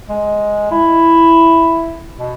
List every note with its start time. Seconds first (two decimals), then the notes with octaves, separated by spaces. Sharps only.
0.09 G#3
0.71 E4
2.18 B2